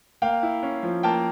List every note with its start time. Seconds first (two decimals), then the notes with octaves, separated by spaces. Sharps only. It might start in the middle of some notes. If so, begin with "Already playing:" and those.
0.22 A#3 F5 G5
0.43 E4
0.63 C#4
0.83 F3
1.03 A#3 G5 A5